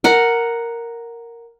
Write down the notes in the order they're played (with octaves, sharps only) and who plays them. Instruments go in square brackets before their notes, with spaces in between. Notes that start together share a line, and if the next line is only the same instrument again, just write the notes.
[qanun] A#4 F#5